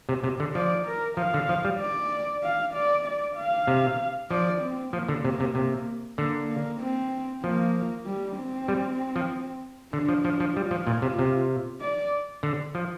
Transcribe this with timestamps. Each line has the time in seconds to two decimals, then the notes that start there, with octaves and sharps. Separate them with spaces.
0.09 C3
0.24 C3
0.40 D3
0.55 F3 D5
0.86 A#4
1.17 F3 F5
1.34 D3
1.49 F3
1.64 G3
1.80 D5
2.43 F5
2.74 D5
3.05 D5
3.36 F5
3.67 C3
4.30 F3 D5
4.62 C4
4.93 F3 A#3
5.08 D3
5.24 C3 A#3
5.40 C3
5.55 C3 A#3
6.18 D3 A#3
6.49 A#3
6.81 C4
7.43 F3 A#3
8.06 G3
8.37 C4
8.68 G3
9.16 F3
9.93 D3 D4
10.09 F3
10.25 F3
10.40 F3
10.55 G3 F4
10.71 F3
10.87 A#2
11.02 C3
11.19 C3
11.81 D5
12.43 D3
12.75 F3